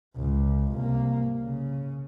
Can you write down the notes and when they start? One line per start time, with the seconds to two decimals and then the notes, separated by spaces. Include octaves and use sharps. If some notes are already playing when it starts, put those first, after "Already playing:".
0.16 C#2
0.72 C2 A#3
1.40 C#3